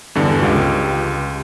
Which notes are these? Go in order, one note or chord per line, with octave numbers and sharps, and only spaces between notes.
E2 G2 D3
C#2 F4 G4